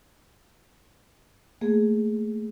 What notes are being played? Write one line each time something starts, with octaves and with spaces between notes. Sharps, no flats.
A3 A#3 G#4